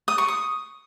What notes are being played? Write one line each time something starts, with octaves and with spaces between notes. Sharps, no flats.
D#6
C#6
D#6